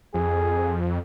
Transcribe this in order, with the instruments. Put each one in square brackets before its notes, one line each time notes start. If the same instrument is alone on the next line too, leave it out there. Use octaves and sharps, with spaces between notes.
[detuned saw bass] F2 [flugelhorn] G#4